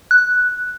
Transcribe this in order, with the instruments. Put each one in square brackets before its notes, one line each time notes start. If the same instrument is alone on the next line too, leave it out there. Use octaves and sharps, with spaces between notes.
[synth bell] F#6